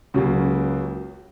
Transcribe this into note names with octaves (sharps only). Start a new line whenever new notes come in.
C#2 C#3 F#3 A#3